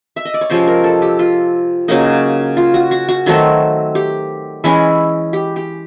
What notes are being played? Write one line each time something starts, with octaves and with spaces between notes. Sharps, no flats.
E5
D#5
D5
C#5
C3 F3 G#3 C#4 C5
A#4
A4
G4
F4
C#3 F#3 A#3 D#4
F4
F#4
F#4
F#4
D#3 F#3 A3 C4
G4
E3 G#3 C#4 E4
G4
G4